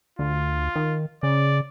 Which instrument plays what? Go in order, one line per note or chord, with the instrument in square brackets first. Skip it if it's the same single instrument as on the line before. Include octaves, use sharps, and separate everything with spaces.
[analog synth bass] D2 [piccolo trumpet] F4
[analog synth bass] D#3
[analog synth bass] C#3 [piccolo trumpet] D5